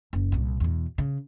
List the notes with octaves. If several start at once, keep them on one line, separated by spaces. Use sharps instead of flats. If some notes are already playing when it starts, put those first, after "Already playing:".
F#1
C2 A#2
E2 B2
C#3